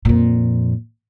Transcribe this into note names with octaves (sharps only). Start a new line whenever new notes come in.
F2 A#2